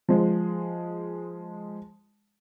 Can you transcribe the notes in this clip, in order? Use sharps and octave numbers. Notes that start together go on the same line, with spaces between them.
F3 G#3